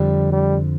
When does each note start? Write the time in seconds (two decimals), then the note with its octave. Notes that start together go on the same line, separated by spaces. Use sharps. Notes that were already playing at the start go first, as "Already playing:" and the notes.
Already playing: F2 D3 F3 G3
0.32 G3